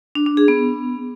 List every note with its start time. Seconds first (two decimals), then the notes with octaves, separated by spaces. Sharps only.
0.15 D4
0.26 D4
0.37 G#4
0.48 B3